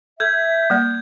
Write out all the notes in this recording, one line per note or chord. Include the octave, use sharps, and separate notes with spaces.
A4 E5 G6 G#6
G3 A#3 D5